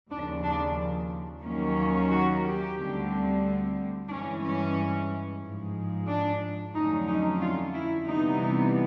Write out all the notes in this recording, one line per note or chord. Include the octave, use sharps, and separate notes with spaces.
D#2 C#3 F3 D4
D4
D#2 D#3 F#3 A#3 C#4
F#4
G4
D2 D3 G3 C4
G2 E3 G#3 C#4 D4
C#4
G#2 F3 G#3
D4
F2 D3 F#3 A3 C#4 D#4
D#4
F4
E4
C3 E3 G3 B3 D#4